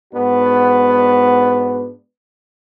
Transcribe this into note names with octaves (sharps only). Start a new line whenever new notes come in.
G#2 B3 D4 F#4